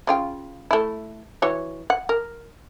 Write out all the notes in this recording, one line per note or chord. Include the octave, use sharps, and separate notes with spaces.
C#3 F4 G5
A3 E4
E3 F#4 C#5
F#5
A#4